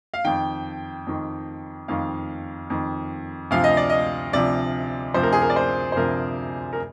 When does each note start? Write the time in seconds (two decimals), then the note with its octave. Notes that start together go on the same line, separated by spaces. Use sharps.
0.14 F5
0.24 F2 D#3 G5
1.07 F2 D#3
1.88 F2 D#3 F5
2.70 F2 D#3
3.51 D2 C3 F3 F5
3.64 D#5
3.77 D5
3.90 D#5
4.33 D2 C3 F3 D5
5.14 D2 C3 F3 C5
5.23 A#4
5.32 G#4
5.41 A#4
5.50 D5
5.56 C5
5.92 C5
5.96 D2 C3 F3 A#4
6.73 A#4